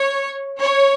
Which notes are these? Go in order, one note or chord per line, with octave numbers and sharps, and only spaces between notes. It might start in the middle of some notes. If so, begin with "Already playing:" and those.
Already playing: C#5
C#5